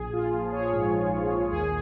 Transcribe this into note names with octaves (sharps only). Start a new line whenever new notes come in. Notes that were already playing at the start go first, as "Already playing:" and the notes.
Already playing: A#1 G#4
F4
F3
G#4 C#5
G#2
A#1
D#2 G#4